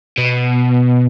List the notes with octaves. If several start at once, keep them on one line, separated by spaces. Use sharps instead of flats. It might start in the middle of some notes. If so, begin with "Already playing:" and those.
B2